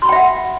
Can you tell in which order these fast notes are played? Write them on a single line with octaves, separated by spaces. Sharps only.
C6 B5 G5 E5 F#5